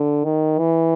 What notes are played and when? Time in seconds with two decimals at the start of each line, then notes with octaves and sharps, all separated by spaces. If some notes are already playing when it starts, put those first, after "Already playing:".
Already playing: D3
0.24 D#3
0.59 E3